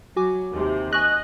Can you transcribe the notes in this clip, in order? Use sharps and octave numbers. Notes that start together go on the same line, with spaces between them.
F#3 F#4 G#5 D6
D#2 C3
D#5 G#5 C#6 F#6 A#6